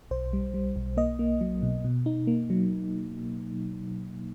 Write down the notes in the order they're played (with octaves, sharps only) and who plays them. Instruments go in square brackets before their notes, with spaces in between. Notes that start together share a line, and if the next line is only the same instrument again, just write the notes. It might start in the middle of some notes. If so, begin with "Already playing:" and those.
[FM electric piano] B1 C5
G3
G3
B1
A#3 D#5
A#3
F#3
B2
B2
D#4
A#3
F#3